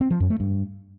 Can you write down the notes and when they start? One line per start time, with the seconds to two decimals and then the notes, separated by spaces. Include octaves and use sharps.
0.01 C4
0.11 F3
0.20 F#2
0.30 A3
0.40 G2